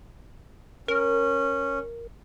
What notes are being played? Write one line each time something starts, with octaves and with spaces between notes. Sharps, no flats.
C#4 A#4